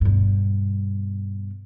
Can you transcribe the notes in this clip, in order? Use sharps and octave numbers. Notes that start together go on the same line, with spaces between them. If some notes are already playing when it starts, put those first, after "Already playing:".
G2 B2